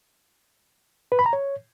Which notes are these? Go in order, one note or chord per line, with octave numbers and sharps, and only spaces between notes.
B4
B5
A#5
C#5